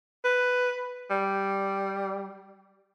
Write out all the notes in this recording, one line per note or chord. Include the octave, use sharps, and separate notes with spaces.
B4
G3